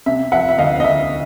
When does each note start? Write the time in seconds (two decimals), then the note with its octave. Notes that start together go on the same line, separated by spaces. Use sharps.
0.06 C3 E5
0.32 F3 E5 F#5
0.49 E5
0.58 D2 D#5 F5
0.80 D#5
0.84 D2 E5